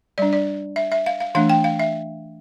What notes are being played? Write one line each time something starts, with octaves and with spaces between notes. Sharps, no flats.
G3 D4 D5
D5
E5
E5
F5
F5
E3 A3 D4 F5
G5
F5
E5